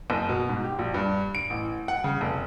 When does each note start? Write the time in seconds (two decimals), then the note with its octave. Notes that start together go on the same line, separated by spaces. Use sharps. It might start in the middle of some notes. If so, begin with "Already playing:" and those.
0.10 F#1
0.29 B2
0.49 G#2
0.64 G4
0.79 A#1
0.94 G2
1.35 D7
1.50 A1
1.88 F#5
2.04 C#3
2.21 F1